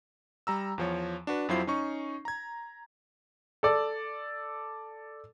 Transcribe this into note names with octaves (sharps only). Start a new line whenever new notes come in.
G3 A#5 E6
E2 F3 C#5
D4 F#4 B4
F2 F#3 E4 F4 C5 C7
C#4 D#4 C#6
A#5 G#6
A4 D5